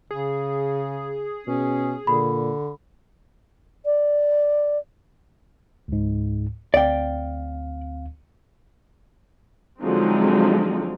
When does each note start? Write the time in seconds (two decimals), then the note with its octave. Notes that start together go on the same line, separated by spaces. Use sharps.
0.11 C#3 G#4
1.47 B2 C#4
2.07 A#2 D3 B5
3.84 D5
5.88 C#2 G#2
6.74 D2 C4 D5 F5 G5
9.82 D3 F3 F#3 G#3 C4 D#4